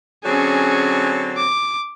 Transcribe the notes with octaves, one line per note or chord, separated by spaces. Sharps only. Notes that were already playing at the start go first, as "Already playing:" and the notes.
D3 F#3 C4 C#4 G#4
D6